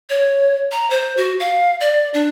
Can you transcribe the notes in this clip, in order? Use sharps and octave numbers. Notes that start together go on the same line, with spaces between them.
C#5
A#5
C5
F#4
F5
D5
D4